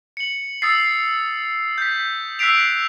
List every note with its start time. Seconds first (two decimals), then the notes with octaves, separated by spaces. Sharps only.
0.17 C#7 F#7
0.62 D#6 E6 A6 C7
1.78 G6 B6
2.39 E6 F#6 B6 C7 D7 F7